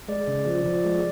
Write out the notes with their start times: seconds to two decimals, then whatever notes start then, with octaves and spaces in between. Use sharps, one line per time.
0.08 G#3 D5
0.27 C#3
0.47 F3
0.65 F3
0.84 G#3